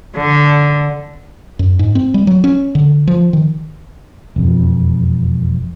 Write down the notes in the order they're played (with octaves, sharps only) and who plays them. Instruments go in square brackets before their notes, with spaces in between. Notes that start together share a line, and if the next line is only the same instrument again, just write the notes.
[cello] D3
[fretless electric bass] F#2
G#2
C4
G3
F#3
C#4
D3
F3
D#3
E1 F2